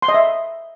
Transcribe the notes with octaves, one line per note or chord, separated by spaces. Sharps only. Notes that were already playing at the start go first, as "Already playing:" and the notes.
C6
D#5
E5